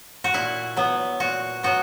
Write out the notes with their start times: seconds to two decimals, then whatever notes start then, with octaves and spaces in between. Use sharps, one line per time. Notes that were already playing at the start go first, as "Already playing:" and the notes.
0.24 F#4
0.34 A#2 E4
0.77 F#3 B3
1.20 A#2 F#4
1.63 F#3 B3 F#4